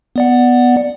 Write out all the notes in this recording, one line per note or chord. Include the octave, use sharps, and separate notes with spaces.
B3 D5 F#5